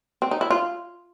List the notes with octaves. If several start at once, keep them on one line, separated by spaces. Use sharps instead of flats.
C4
D#4
E4
F4